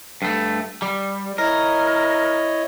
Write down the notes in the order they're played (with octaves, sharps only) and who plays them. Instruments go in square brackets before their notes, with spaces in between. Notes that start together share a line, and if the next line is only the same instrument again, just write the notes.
[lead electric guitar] G2 A3
G3
[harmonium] E4 C#5 D#5 [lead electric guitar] A#4